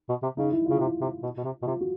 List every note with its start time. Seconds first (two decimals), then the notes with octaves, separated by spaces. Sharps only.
0.09 B2
0.23 C3
0.37 C#3 D#4
0.51 E4
0.66 F4
0.70 C#3
0.80 C3 E4
1.01 C3
1.23 B2
1.37 B2
1.44 C3
1.62 B2
1.66 C3 F4
1.81 F#4